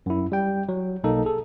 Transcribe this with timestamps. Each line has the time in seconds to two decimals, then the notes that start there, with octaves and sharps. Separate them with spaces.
0.06 F#2 E4
0.32 G3 G5
0.69 F#3
1.04 B1 A#3 D#4 A4
1.25 G#4 A4